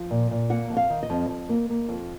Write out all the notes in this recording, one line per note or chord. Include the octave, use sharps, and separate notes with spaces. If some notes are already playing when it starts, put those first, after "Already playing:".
Already playing: F3
A#2
A#2
A#3 F#5
F2
F5
D#3
D#5
F2
F2
A#3
A#3
F2